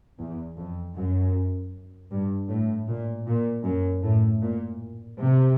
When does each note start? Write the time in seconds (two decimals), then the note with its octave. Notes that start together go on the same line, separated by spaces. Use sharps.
0.20 E2
0.58 F2
0.96 F#2
2.12 G2
2.50 A2
2.89 A#2
3.28 A#2
3.65 F#2
4.04 A2
4.42 A#2
5.19 C3